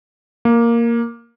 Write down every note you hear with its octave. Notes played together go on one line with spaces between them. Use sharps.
A#3